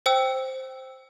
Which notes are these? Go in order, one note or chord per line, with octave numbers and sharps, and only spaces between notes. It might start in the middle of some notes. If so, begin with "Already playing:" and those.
C5 G5 E6